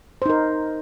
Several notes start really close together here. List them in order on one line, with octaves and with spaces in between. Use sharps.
C5 D#4 A#4